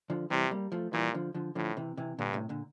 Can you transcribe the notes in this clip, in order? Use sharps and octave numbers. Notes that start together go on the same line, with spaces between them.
D3 F3
C3 E3 G3
G3 A#3
F3 A3
A#2 E3 G3
D3 F3
D3 F3
A2 D3 F3
C3 E3
C3 E3
G2 A#2 D3
A2 C3
A#2 D3